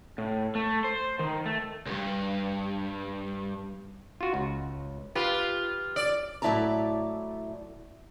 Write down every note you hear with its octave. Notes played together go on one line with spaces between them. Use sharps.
A2
A3
C5
D#3
A3
C#2 G2
F4 F#4
C#2
F4 G4 B4 F5
D5
A2 F#3 E4 D5 A5 A#5